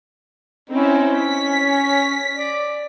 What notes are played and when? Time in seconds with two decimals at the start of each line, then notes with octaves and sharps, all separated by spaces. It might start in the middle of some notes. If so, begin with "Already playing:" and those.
0.70 C4 C#4 D#4 E4
1.17 B6
2.36 D5